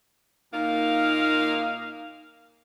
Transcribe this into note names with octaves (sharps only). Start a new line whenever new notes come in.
A#2 A#3 D#4 F5